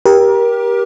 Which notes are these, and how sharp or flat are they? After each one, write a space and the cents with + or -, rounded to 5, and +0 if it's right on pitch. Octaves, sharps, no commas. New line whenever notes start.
G4 +0 A#4 +30